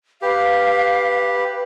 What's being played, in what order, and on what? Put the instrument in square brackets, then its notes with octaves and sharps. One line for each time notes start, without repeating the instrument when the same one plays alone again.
[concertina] G4 [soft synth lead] B4 [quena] F5